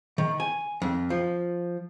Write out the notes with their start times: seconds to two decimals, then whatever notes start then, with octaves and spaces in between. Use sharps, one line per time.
0.18 D#3
0.40 G#5
0.82 F2
1.10 F3